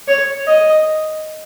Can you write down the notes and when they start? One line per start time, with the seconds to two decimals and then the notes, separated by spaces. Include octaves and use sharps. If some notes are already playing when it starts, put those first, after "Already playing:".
0.08 C#5
0.47 D#5